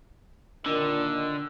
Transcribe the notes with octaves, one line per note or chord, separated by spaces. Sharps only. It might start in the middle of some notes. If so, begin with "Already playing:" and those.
A#2 D3 D#3